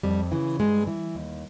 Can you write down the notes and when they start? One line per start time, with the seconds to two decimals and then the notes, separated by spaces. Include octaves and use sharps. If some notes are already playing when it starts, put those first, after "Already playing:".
0.03 F2 G3
0.31 C#3 E3
0.59 G2 G#3
0.87 E3
1.15 D#2